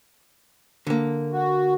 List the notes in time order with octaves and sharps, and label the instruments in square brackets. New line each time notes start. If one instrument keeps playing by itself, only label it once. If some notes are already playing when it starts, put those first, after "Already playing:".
[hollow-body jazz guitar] D3 A#3
[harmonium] F#4